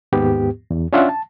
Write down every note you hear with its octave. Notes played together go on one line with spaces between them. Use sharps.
D#2 G#2 B3 G4
E2
C#4 D4 F4 E5 F#5
A5